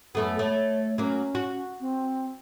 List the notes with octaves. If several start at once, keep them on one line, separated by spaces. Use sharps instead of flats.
F#2 A3 B3 A4
A3 C#5
F#3 A#3 C#4
F#4
C4